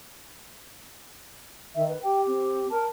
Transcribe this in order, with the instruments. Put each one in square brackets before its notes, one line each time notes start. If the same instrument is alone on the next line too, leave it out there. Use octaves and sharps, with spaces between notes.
[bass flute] D#3 [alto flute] E5
[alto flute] B4
[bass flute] G4 [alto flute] G5
[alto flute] C4
[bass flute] A#4 [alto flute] A5